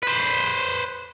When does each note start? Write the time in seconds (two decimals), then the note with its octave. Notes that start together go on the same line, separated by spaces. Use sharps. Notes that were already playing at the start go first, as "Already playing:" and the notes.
0.03 B4 C5